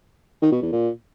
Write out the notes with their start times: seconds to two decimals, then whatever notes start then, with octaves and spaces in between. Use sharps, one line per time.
0.42 D#3
0.52 B2
0.62 E2
0.72 A#2